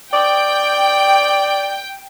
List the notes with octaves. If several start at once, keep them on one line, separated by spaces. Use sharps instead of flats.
D5 G5